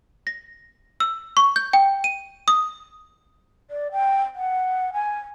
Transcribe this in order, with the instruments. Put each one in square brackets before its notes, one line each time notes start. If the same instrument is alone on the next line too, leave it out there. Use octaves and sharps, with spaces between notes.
[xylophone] A#6
E6
C#6
G6
G5
D#7
D#6
[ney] D5
G5
F#5
G#5